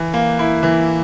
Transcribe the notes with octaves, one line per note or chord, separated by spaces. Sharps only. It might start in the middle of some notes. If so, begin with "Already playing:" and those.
Already playing: E3
A#3
E4
E3